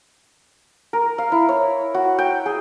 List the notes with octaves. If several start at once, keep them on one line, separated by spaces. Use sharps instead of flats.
A#4
F5
E4
C#5
F#4
G5
G#4